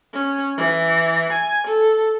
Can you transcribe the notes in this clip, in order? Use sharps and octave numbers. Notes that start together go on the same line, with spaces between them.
C#4
E3
G#5
A4